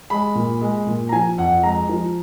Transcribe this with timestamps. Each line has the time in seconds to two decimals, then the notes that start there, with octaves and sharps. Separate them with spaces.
0.10 G#3 B5
0.35 A#2
0.61 G#3
0.87 A#2
1.09 A#5
1.12 F3 G#5
1.38 F2 F#5
1.63 G#3 A#5
1.89 F3